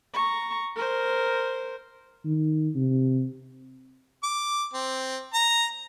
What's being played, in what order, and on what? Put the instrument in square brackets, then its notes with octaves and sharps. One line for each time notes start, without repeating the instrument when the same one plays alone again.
[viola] A#5 C#6
A#4 C5
[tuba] D#3
C3
[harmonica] D6
C4
A#5